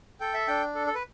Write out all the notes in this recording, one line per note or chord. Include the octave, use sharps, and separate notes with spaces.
A4 G5
E5
D4 G5
A4
A4
B4